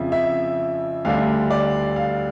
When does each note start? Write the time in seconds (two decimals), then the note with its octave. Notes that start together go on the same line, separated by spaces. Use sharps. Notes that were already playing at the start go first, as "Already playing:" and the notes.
Already playing: F2 C#3 F3 E5
0.12 E5
1.05 D2 D3 G3 D4 F5
1.50 D5
1.96 F5